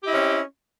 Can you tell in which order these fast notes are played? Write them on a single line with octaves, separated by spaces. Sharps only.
G4 E4 D#5 C4 C#4